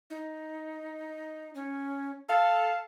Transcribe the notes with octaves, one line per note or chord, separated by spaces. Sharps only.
D#4
C#4
A4 F5 A5